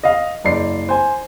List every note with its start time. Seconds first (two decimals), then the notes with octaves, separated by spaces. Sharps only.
0.04 D#5 F5
0.44 F#1 D5 C7
0.89 C5 G#5